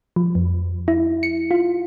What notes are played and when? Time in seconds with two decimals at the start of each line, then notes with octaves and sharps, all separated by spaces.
0.16 F3
0.35 F2
0.88 E4
1.23 C#7
1.51 F4